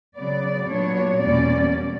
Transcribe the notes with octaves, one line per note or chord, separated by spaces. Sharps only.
C#3 F#3 B3 D5
A#2 F#3 B3 D4 C#5
E2 B2 G3 A#3 C#4 D5